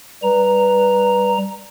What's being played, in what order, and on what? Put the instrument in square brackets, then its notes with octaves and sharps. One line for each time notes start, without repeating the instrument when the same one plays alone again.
[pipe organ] G3 A#5 [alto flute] B4